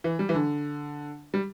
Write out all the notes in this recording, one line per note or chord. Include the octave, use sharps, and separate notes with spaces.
E3
G3
E3
D3
G3